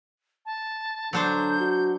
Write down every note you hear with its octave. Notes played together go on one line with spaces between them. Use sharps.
A5
D3 F#3 D4 C5 G6
F#4